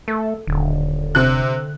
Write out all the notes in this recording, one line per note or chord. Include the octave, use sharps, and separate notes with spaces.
A3 A4
D#1 D3
C3 F#6